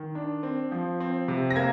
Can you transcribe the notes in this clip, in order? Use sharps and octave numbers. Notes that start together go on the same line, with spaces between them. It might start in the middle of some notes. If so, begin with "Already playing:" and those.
Already playing: D#3
D4
C4
F3
C4
C3
A#6
A#3 G#6